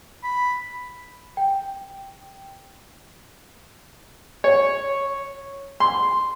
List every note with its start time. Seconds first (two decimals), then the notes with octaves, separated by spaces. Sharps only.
0.24 B5
1.37 G5
4.44 C#5
5.80 C6